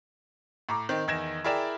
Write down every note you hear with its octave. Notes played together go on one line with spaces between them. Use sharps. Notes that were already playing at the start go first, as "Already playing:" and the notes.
A2 A#5 D6
D#3 C4
E2 D#3 G#6 A#6 E7
E4 G#4 A#4 D5 G5 E7